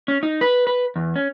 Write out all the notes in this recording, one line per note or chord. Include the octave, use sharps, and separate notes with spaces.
C#4
D#4
B4
B4
E2
C#4